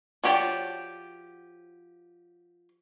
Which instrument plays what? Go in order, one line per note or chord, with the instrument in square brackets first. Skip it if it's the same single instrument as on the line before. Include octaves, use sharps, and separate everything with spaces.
[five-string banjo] F3 F#4 G4 C#5 D5